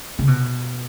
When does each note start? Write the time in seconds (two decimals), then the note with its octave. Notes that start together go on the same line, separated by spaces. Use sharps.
0.19 C#3
0.27 B2